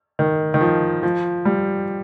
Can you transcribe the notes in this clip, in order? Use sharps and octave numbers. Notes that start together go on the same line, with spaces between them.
D#3
D#3
F3
F3
G3